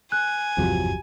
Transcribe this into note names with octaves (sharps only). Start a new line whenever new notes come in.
G#5 F#6
G#1 E2 G2 C3 F3 F#3